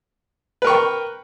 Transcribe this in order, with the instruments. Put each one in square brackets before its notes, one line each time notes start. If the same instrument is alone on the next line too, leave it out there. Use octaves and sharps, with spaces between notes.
[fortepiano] B4
A#4
C#6
G5